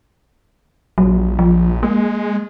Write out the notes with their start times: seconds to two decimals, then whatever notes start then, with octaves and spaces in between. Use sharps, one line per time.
0.98 A#1 F#3
1.39 F3
1.83 G#3 A#3